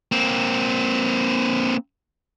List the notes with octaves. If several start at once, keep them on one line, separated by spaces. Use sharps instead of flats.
A#3 C4